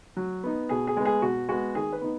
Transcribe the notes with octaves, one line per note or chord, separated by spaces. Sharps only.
F#3
B3 D#4
B2 G#4
G#4
G#3 B3
G#4
B2 F#4
G#3 B3 F#4
D#3 G#4
B4
B3 D#4